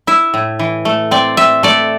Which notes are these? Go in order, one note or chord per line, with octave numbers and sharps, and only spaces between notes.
E4 E5
A2
E3
A3
C4 D5
C4 E5
A3 D5